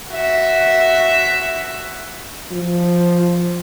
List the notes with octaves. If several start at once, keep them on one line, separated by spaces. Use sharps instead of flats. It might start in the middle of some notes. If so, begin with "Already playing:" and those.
F#4 E5
F3